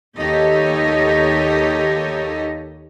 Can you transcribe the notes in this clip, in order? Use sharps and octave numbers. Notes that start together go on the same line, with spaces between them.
D#2 D#4 G4 A4 C#5 D#5